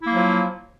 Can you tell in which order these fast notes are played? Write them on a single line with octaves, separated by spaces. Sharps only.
E4 A#3 F#3 F3